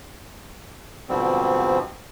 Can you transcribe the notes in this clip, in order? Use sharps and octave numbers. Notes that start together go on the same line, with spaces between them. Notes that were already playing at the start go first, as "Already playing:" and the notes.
G#2 B2 D3 F3 G3 C4